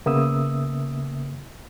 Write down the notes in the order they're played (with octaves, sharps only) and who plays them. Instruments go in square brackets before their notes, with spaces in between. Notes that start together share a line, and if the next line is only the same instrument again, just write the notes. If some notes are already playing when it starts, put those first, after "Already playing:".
[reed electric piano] C#3 A#3 B3 E5 D#6 E6